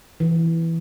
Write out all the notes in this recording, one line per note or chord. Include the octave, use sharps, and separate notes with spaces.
E3